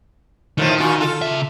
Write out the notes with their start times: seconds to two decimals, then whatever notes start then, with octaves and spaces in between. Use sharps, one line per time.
0.58 A2 D#3 F3 A3
0.78 A#2 F4 F#4
1.01 F4 A4
1.22 C#3 E5